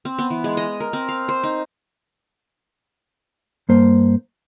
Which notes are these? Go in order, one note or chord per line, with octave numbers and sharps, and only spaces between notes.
C4
B3
E3
G#3
D#5
A#4
C4
F5
C5
D#4
G2 A#3 C5